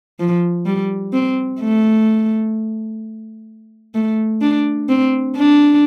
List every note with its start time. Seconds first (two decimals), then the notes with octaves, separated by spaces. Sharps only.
0.19 F3
0.66 G3
1.13 C4
1.60 A3
3.94 A3
4.41 D4
4.89 C4
5.36 D4